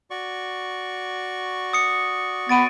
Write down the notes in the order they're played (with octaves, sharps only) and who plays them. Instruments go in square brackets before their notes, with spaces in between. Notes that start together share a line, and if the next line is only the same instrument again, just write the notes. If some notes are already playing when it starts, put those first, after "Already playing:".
[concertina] F#4 D5 C#6
[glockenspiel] D#6 C#7
[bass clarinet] B3 [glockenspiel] A6 D7 D#7